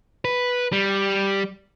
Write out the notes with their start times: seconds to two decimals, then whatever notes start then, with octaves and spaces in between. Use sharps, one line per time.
0.25 B4
0.72 G3